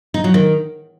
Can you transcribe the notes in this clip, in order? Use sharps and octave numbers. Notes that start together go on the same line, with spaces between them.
D#4
F#3
D#3